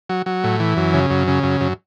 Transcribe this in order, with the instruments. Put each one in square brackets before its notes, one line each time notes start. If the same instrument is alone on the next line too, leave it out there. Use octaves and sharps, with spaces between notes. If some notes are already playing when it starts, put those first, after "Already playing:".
[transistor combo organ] F#3
F#3
A2
E3
F#2
C#3
F#2
C#3
F#2
F#2